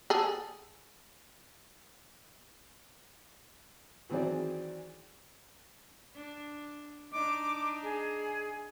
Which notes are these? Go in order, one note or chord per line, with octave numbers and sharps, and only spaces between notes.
G#4 A4
D#3 E3 F#3 C4 G#4 D5
D4
D4 D#4 D6
G#4